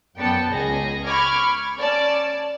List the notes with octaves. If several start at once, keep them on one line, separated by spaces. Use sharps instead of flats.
F#2 B3 D5 G5 A5 C#7
C#2 G#4 D#5 A#6
B5 C#6 D6 F6 G#6
C#4 D5 A5